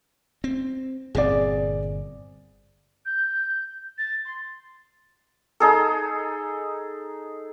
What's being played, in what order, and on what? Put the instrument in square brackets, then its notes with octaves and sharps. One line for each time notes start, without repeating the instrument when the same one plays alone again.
[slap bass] C4
[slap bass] G1 A#2 C4 [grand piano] G#4 D5
[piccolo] G6
A6
C6
[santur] D#4 G#4 A4